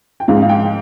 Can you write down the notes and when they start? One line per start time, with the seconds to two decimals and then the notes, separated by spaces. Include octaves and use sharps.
0.20 G5
0.28 G#2 F5
0.42 F5
0.49 G5